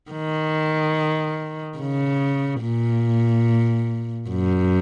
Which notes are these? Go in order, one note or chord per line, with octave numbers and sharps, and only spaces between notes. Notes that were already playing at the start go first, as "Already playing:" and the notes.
D#3
C#3
A#2
F#2